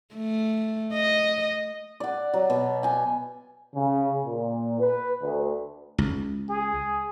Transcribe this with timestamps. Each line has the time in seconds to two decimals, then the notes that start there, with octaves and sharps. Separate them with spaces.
0.15 A3
0.93 D#5
2.00 D5 F#5
2.34 F#3
2.50 B2
2.83 G5 G#5
3.75 C#3
4.25 A#2
4.80 B4
5.23 D2
5.98 C#2
6.50 G#4